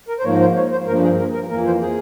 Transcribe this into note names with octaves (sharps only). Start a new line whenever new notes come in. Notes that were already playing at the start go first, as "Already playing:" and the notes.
A#4
C5
G#2 F3 A#3 C#5
C5
C#5
C5
G2 F3 A#3 A#4
G#4
A#4
A#4
F2 E3 A#3 A#4
C5
G#4